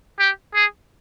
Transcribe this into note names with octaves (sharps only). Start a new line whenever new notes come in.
G4
G#4